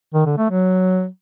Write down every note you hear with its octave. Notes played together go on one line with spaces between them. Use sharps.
D#3
D3
A3
F#3